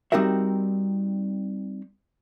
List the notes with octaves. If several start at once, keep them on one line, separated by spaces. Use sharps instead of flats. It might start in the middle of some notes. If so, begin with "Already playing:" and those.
G3 C4 D#4 F#4 A#4 E5